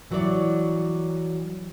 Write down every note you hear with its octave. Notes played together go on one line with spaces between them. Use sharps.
E3 F#3 G3 C#5 D5